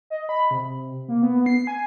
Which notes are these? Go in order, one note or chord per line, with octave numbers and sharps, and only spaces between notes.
D#5
B5
C3
A#3
B3
C7
G#5